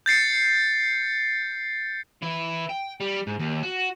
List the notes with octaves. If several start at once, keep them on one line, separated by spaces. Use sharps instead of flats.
G6 A6 C7 C#7
E3 E4
G5
G3
G#2
D#2
F#4